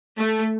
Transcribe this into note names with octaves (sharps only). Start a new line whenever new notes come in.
A3